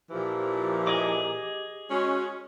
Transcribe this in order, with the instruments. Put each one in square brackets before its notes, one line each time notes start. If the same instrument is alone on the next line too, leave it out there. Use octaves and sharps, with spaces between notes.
[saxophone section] A#2 E3 F3 [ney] G4
[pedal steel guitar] G#4 D#5 D6
[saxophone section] G#3 C#4 [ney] F#4